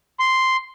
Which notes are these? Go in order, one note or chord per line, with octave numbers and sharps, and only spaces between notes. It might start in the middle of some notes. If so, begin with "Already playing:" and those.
C6